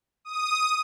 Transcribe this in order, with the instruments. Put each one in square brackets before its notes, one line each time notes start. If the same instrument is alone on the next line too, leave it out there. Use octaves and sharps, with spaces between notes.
[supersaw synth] D#6